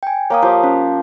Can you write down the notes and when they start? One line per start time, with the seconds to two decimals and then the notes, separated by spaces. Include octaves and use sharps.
0.03 G5 G#5
0.30 A#3 C#5 F5 D#6
0.42 F3 G4
0.64 C#4